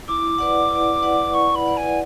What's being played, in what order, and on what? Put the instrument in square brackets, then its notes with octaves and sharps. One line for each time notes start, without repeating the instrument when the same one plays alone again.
[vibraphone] E4 [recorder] D6
[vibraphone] B4 D5 F#5
E4
B4 D5 F#5
[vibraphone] E4 [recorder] C#6
[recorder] B5
[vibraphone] B4 D5 F#5
[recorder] G#5